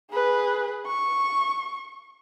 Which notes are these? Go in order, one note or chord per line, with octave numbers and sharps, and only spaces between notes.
G#4 B4
C#6